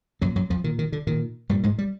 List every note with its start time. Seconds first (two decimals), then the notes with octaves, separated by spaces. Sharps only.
0.21 F#2 A#2 F#3
0.36 F#2 F#3
0.50 F2 F3
0.64 A#2 D#3
0.79 D#3
0.92 D3
1.07 A#2 D#3
1.49 G2 A#2 G3
1.63 G#2 G#3
1.78 G3